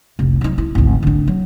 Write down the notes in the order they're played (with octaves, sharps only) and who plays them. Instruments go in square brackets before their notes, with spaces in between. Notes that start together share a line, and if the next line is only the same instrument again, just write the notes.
[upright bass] F1 C2
F#3 D#4
E4
G#1 D2
D3 D4
F#3